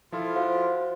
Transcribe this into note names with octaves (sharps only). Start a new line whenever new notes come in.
F3 E4 F4 A4
F#4 C5 F5